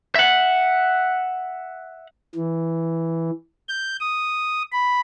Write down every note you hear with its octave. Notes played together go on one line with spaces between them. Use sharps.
E5 F#5
E3
G6
D#6
B5